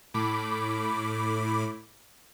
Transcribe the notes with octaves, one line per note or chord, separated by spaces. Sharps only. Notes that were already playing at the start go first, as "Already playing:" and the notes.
A2 B5 D6